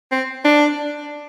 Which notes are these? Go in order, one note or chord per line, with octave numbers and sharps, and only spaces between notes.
C4
D4